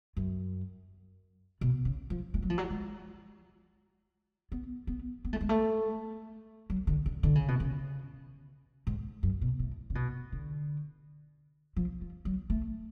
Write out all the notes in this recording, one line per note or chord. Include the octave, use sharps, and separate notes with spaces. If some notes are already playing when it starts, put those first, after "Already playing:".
F#2
B2
C#3
F3
G#3
F#3
F3
F#3
G#3
B3
B3
B3
A3
G#3
A3
F#3
D3
D3
D3
C#3
B2
C#3
G#2
F#2
B2
A2
C#3
B2
D3
F3
F3
F#3
A3